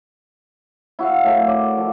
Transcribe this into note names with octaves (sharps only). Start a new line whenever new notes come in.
E4 F#4 E5 F5
A2 A4 A#4
D5
F3